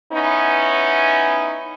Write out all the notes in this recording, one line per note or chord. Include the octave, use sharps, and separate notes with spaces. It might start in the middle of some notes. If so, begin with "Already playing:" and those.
B3 C#4 D#4 E4